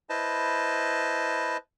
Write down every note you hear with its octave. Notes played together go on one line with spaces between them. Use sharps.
E4 B4 C5 D#5 A5